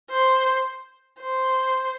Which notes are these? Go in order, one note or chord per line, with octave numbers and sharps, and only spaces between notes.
C5
C5